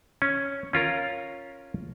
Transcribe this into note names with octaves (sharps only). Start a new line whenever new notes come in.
C#4
C#4 F4 A#4 A#5